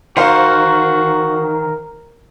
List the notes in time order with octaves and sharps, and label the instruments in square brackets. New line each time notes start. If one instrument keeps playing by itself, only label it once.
[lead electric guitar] D#3 [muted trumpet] F#4 [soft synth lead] A#4 [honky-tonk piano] C5 F5